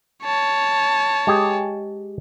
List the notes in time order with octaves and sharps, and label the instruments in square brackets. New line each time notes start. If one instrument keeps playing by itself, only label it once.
[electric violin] C#5 A5
[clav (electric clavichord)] G#3 G4 G#4